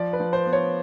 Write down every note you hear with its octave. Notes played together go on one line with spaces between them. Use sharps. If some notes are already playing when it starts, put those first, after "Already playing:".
Already playing: F3 D5
B4
F3
C5
B3
C#5